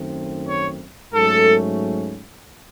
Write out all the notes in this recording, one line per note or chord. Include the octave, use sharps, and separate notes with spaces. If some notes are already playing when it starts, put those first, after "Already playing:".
Already playing: F#2 D#3 A3 C4
C#5
G#2 F#3 A3 C#4 A4